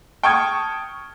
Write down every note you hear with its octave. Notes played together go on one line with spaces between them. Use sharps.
G5 A5 C#6 D#6 F6 G#6